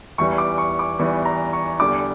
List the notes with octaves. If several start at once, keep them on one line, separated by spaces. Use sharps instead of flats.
E2 E3 G3 C#6
D6
C#6
D6
E2 E3 G3 C#6
A#5
C#6
E2 D3 G3 D6